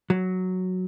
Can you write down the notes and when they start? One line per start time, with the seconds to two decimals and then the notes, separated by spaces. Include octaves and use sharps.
0.10 F#3